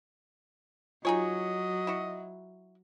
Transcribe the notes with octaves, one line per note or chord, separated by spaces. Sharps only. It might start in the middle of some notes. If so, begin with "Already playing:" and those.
F#3 D#4 F4 G#4 C#5 D#5
E4 F#4